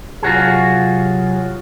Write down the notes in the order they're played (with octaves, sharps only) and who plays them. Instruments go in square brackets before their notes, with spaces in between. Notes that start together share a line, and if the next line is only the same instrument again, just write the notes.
[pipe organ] C3 F#3 [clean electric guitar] F4 F#4 G#4